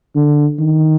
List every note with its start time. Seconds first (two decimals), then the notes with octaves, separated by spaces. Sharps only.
0.15 D3
0.60 D#3